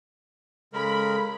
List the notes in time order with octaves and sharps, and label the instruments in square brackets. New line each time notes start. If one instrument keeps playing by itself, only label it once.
[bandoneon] C#3 G#3 A#4 [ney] A4 [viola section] B5